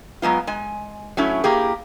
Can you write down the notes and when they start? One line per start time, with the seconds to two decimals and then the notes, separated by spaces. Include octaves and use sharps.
0.22 F#3 G#3 B3 F4
0.47 G#3 G#5
1.17 F#3 A3 C#4 E4
1.44 A#3 E4 G4 G#4